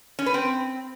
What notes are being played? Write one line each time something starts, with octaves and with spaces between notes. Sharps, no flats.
C#4
B4
C4